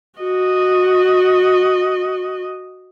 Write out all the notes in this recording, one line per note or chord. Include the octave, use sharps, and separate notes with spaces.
F#4 D#5